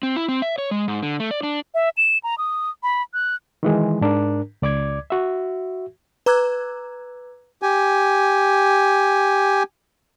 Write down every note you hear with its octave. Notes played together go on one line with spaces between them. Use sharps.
C4
E4
C4
E5
C#5
G#3
G#2
D3
A3
D5
D4
E5
E7
A#5
D#6
B5
F#6
D#3 E3 G#3
G#2 D4 A#4
C#2 D5 D6 G#6
F#4 E5
B4 A#5 D6 E6 F#6 G#6
G4 G#5